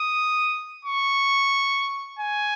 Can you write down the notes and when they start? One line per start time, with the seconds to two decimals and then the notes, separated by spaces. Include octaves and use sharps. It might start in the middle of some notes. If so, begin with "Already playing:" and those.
Already playing: D#6
0.85 C#6
2.19 G#5